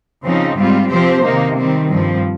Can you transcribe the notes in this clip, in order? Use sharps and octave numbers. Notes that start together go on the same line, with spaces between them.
C#3 F3 C4 D#4
G#2 G3 C4 F4
C3 F3 C4 G4 C5
C3 D#3 A#3 D#4
D#3 G3 C4
G2 F3 C4